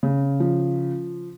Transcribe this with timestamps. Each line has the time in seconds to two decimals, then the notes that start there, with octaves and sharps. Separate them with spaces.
0.03 C#3
0.40 F3